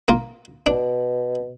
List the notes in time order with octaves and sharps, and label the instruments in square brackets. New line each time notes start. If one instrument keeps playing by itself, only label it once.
[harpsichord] A#3 F4
[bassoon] B2 [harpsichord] D4